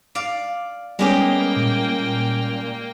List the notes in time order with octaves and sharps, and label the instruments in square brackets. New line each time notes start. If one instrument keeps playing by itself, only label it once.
[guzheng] D5 F5
[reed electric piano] G3 C#4 [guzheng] G#3 G4 D#5 [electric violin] A#3 G5 [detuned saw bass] B3
[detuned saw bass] A#2